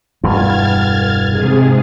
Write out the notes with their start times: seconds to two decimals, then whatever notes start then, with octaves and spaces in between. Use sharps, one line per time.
0.24 E1 G2 E3 F6 G#6 A6
1.28 G#2 C3 G#4